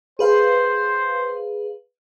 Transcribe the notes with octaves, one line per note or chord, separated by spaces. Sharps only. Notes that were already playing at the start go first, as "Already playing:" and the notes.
G#4 B4 C5 F5